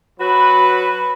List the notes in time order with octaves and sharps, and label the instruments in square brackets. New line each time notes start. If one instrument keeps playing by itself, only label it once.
[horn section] F#3 F#4 B4 [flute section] B5